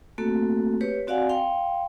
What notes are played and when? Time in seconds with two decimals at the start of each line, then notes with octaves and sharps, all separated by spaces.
0.18 A3 A#3 C4 F#4 A4
0.81 G4 B4 C#5
1.07 C4 F#4 D5 F5 F#5 G#5
1.29 F5 G5 C6